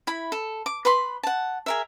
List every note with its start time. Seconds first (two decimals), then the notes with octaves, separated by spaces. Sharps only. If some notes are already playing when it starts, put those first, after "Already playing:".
0.07 E4 B5
0.32 A4
0.66 D6
0.85 B4 B5 C6
1.23 F#5 A5
1.66 G#4 A#4 E5